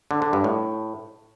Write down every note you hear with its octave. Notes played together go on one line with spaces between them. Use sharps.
D3
D3
G2
A2